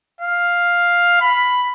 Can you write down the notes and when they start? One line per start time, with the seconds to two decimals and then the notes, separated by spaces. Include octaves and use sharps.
0.21 F5
1.21 B5